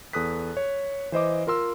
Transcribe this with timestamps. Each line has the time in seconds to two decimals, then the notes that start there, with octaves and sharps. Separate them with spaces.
0.13 E2 A4 D#6 F#6 B6
0.57 C#5
1.12 E3 C5 D#5 D6
1.47 F4 A#4 C6 E6